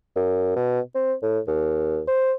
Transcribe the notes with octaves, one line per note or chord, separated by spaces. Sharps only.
F#2
B2
C4
A2
D#2
C5